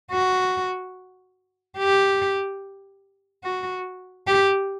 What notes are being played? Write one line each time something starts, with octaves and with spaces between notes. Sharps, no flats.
F#4
G4
F#4
G4